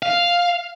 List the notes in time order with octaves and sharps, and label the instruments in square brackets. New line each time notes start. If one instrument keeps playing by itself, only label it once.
[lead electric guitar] F5